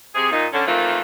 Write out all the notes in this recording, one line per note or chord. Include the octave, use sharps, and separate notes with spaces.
C3 G#4
A#2 D#4
D3 C#4
D#3 E3 A3 A#3 C4 F4